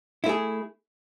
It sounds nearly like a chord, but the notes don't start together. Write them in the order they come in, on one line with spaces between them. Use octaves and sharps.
E4 A3 G#4